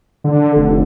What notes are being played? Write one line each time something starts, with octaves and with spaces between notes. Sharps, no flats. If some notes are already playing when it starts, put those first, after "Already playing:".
D3
F1